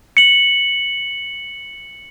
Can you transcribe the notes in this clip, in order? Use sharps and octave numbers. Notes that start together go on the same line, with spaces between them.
C#7 F#7